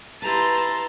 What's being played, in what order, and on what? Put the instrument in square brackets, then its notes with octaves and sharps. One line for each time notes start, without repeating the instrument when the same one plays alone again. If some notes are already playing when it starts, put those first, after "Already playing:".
[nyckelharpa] E4 A#5 [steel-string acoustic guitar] G4 B4 [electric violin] A5 C6